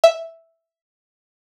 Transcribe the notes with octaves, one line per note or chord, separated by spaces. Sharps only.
E5